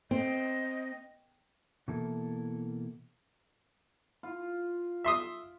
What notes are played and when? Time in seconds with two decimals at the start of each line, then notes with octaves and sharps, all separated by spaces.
0.11 C4 D#5
1.88 B2 E3 A#3 E4 A4
4.23 F4
5.04 E5 C6 D#6